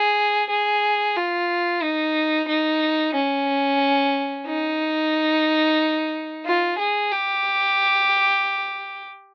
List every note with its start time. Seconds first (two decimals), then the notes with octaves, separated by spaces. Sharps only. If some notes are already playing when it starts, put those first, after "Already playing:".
Already playing: G#4
0.50 G#4
1.16 F4
1.82 D#4
2.48 D#4
3.14 C#4
4.47 D#4
6.45 F4
6.78 G#4
7.11 G4